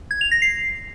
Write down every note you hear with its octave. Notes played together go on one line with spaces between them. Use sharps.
G#6
F7
A#6
C7